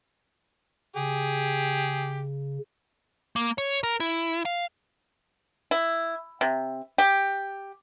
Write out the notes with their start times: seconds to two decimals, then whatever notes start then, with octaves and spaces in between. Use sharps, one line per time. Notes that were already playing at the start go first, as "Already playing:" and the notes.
0.96 C#3 G4 G#4
3.36 A#3
3.58 C#5
3.83 A#4
4.00 E4
4.45 F5
5.71 E4
6.41 C3
6.98 G4